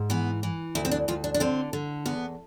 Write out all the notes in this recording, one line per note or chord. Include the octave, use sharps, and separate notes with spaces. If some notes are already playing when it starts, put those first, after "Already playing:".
Already playing: G#2
E3 B3
E3
D2 E4
C4
D4
D2 F4
D4
D4
D3 C4
D3
E2 B3